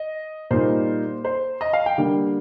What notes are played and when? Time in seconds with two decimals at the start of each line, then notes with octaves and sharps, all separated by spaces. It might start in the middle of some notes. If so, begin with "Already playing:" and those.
Already playing: D#5
0.51 A#2 G3 A#3 D#4 C5
1.25 C5
1.61 D#5
1.73 F5
1.86 G5
1.98 D3 G3 A#3 D4